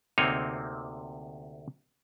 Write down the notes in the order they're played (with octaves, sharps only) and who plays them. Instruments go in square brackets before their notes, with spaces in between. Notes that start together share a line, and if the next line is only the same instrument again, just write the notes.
[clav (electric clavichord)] D2 C3 A#3 C4 D#4 C#5